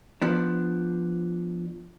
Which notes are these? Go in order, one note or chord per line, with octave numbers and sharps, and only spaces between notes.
F3 B3 D4